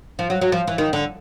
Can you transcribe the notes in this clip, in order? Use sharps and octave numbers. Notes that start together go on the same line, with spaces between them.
F3
F#3
F#3
F3
E3
D#3
D3